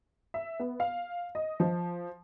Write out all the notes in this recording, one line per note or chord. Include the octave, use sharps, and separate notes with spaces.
E5
B3
F5
D#5
F3